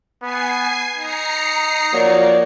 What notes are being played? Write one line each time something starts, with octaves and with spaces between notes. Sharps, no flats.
B3 G#5 C7
D#4 A#5 C7 C#7
F3 F#3 A#3 D5